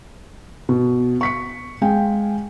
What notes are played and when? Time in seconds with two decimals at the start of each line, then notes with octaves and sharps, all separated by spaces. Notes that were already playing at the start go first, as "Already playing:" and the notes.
0.69 B2
1.21 C#6 B6 C#7
1.82 G#3 F5 G5 G#5